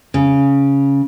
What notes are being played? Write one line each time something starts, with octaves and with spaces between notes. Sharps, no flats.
C#3